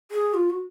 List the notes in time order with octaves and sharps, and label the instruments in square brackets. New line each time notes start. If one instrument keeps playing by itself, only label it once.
[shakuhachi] G#4
F4
F#4